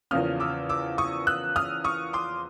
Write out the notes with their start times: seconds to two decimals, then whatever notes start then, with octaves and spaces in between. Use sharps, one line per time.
0.11 E2 C#3 F3 A#3 C#4 D#6 F6
0.40 D6 E6
0.69 D6 E6
0.98 C#6 D#6
1.27 E6 F#6
1.56 D#6 F6
1.84 C#6 D#6
2.13 C6 D6